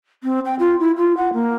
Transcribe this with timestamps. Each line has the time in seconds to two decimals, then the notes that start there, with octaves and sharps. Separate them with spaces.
0.23 C4
0.45 G5
0.59 F4
0.80 E4
0.97 F4
1.17 F#5
1.33 A#3